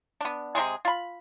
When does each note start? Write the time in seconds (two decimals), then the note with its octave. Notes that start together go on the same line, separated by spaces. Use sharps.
0.21 B3 D4
0.55 C3 G3 G#3 G#4
0.85 F4 B5